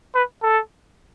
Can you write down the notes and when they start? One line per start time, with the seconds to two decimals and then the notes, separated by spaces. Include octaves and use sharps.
0.15 B4
0.42 A4